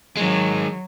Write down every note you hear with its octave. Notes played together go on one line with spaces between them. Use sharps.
D#3 F#3 G#3